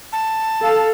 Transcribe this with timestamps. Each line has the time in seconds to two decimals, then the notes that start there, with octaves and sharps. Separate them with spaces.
0.12 A5
0.62 A4 F5